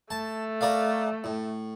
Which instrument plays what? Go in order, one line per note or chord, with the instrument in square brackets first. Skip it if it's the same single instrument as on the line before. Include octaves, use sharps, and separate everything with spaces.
[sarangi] A3 [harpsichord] A5
[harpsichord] A#4 D5 F5
A2